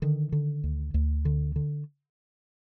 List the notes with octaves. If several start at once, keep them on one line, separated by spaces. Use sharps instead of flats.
D3 D#3
D3
D2
D2
D3
D3